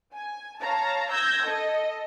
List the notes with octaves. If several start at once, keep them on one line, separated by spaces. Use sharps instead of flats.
G#5
C#5 F5 A5 A#5
E6 G6 G#6 A#6
A4 D#5